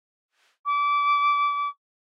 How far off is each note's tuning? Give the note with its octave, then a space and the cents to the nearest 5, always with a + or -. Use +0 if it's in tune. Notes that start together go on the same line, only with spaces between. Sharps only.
D6 -25